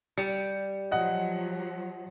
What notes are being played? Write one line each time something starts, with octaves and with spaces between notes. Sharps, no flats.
G3 C#7
F3 F#3 D#5 F#5